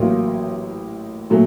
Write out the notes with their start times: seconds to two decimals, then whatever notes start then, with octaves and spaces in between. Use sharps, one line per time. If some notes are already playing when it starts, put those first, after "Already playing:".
Already playing: A1 A2 F#3 A#3 F4
1.30 A#2 F#3 A3